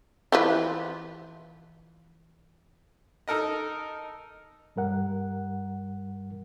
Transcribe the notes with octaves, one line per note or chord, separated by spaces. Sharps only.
E3 F3 B4
D#4 A4 A#4 D#5
G2 G3 A#4 F#5